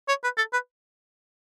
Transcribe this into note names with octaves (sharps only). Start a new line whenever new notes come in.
C#5
B4
A4
B4